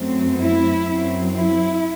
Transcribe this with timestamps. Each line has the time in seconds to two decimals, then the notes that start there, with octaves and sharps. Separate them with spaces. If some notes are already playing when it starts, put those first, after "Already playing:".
Already playing: F#2 F#3 A3 C4
0.38 E4
0.86 F#2 F#3 C4
1.34 E4